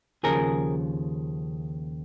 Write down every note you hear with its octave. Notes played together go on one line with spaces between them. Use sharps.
D#2 C#3 F3 G#4 A#4